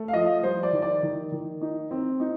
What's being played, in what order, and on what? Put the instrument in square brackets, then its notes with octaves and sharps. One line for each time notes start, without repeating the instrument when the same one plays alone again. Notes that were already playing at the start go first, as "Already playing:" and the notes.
Already playing: [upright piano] A3
F5
F3 D#5
G3 C5
D5
D#3
D5
D#3
D#3
D#4
C4
D#4